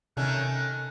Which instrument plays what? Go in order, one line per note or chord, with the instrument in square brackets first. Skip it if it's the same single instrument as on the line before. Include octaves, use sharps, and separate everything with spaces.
[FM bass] C3 [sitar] D#3 A3 C#4 [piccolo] F#6